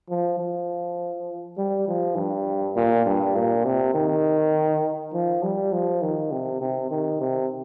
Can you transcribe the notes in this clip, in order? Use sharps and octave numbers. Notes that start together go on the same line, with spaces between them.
F3
F3
G3
F3
G2
A#2
G2
A#2
C3
D#3
F3
G3
F3
D#3
C3
C3
D#3
C3